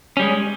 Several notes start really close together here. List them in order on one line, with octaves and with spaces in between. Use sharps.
C#4 G3 G#3